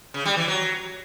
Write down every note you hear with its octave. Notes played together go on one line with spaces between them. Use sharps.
C#3
G3
E3
F#3